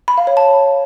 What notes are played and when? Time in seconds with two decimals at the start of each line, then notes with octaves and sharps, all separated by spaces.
0.08 B5
0.18 F5
0.27 C#5
0.37 A5